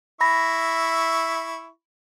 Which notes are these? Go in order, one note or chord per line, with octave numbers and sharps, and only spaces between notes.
E4 E5 B5 C#6 A#6